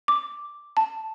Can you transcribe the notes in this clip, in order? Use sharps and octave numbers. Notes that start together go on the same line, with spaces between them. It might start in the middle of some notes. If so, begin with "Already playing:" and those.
D6
A5